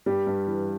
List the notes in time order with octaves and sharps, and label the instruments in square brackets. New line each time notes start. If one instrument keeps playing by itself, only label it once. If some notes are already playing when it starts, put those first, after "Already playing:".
[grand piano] G2 G3 G4
G2
E3